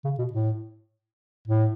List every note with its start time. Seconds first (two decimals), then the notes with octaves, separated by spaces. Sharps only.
0.04 C#3
0.19 B2
0.33 A2
1.48 A2